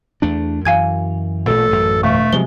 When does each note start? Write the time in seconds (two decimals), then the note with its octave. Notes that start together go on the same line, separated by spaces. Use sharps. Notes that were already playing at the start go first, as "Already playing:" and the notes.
0.22 E2 A3 D4
0.65 F#2 E3 F5 G#5 G#6
1.47 A1 A#2 A3 A4
1.71 A1 F#2
2.03 E1 A3 F5 C#6
2.33 C3 F3 F#3 G#3 G7